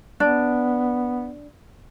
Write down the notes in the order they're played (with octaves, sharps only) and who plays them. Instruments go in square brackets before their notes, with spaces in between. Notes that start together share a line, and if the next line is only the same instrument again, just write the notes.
[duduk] B3 [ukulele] D4